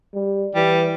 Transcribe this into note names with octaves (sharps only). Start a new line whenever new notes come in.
G3
E3 G3